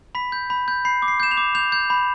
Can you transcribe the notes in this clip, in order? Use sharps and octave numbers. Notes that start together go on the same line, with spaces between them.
B5 B6
G6
B5
G6
B5 C7
D6
C7
G6 E7
F7
D6
G6 F7
G6
B5